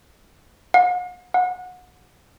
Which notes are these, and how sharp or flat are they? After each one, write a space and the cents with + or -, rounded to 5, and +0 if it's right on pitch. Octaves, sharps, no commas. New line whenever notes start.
F#5 -45
F#5 -25